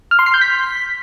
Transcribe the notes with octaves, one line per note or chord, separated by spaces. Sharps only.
F6
C6
C7
G6
B6